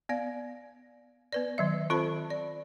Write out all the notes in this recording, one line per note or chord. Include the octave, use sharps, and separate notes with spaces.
B3 D5 F5
B3 B4 D5
D#3 F#3 E5
C4 F4 A4 C5 A5 B5
D5